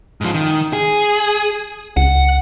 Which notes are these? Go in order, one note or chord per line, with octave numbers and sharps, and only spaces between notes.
G#2 F3
D#3
G#4
C#2 F#5